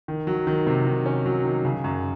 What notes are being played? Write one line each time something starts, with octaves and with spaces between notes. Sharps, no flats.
D#3
F#3
D#3
C3
D#3
C#4
F#3
D#3
C#3
F#2